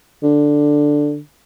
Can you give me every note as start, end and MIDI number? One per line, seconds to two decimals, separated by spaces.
0.23 1.18 50